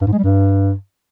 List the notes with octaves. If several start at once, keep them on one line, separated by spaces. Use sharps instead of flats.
G2
G#2
G#3
G3
G2